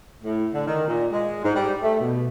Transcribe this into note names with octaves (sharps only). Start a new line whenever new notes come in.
A2
D3
D#3
A#2
G#3
G#2
G3
A3
B2